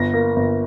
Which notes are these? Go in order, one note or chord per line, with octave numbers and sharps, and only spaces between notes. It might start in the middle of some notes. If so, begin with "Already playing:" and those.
Already playing: G1 A#6
A#3
G1